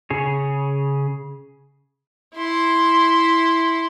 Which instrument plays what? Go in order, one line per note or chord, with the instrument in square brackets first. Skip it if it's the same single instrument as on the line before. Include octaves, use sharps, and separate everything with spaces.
[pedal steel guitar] C#3 G#4 C#5
[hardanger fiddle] E4 C6